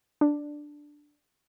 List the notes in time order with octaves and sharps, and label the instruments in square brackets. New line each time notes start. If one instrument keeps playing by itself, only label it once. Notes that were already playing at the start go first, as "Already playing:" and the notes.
[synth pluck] D4